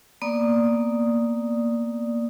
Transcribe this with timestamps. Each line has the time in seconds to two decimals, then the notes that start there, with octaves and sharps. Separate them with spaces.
0.22 A#3 B3 D5 D#6